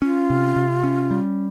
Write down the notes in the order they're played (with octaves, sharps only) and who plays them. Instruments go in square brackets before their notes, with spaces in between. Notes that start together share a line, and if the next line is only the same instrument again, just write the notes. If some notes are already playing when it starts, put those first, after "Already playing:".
[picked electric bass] C#4 [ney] F4
[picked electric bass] C3
C3
C#4
G3